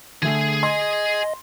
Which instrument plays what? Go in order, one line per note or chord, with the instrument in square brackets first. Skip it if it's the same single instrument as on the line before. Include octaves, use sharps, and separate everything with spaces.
[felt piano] D3 A3 [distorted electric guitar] G#4 G#5
[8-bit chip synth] D#5 [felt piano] C6